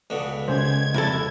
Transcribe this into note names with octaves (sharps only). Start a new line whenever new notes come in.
C#2 B2 D3
C#3 G#3 C5 G#6
C2 F2 A4